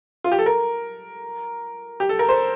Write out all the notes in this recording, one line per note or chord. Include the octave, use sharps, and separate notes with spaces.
F4
G4
A4
A#4
G4
A4
A#4
C5